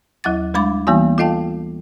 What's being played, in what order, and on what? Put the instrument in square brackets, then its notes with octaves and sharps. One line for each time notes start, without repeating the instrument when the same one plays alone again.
[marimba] D#2 F#3 E4 F#5 D6 A6
G3 G#3 D4 B5 D6 A6
E3 G3 A#3 B3 D#4 F#4
F4 A4 D#5 F5 G5 A5